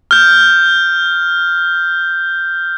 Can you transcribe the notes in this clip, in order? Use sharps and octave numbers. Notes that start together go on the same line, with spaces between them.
F6 G6